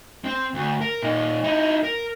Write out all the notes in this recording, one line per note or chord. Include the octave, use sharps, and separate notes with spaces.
C4
D2
A#4
A#2 D#4
D#4 E4
A#4